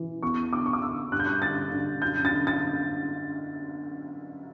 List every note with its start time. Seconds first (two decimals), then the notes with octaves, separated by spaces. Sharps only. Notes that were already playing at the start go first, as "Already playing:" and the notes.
Already playing: E3
0.23 E2 C#6
0.52 D3 D6
0.66 C#6
0.73 D6
0.82 D3 E6
1.12 G2 F#6
1.19 G6
1.26 F#6
1.42 D3 A6
1.72 D3
2.02 F#2 G6
2.25 A6
2.32 D3
2.47 A6